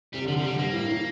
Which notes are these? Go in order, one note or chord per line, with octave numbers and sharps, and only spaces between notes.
C3 G3
D3 F3
C3 F3
D3 G3
G2 A#3
A2
E3